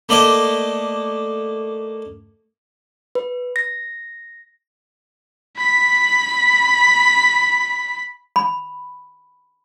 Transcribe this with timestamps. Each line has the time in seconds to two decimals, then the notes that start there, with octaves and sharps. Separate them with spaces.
0.09 A3 A#3 A4 D5 D#5
3.15 B4
3.56 A#6
5.56 B5 B6
8.36 B5